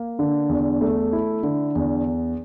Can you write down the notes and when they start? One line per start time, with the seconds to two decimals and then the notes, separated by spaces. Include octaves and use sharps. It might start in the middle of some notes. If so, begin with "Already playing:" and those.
Already playing: A#3
0.19 D3
0.49 E2
0.81 A3
1.13 E4
1.43 D3
1.75 E2